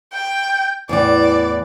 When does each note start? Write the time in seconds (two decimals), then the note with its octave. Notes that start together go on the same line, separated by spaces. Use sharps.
0.13 G5
0.89 E2 A2 E3 D5